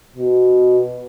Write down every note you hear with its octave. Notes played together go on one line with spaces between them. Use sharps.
B2